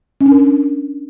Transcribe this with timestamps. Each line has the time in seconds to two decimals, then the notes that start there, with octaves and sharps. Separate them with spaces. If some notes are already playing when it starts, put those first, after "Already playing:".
0.21 C#4
0.26 D4
0.31 A#4